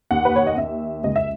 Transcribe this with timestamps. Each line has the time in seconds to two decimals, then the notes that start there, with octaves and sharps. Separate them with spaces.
0.11 D#2 F#5
0.25 B4
0.36 C#5
0.47 D#5
0.57 D#2 E5
1.04 C#2 D#5
1.16 E5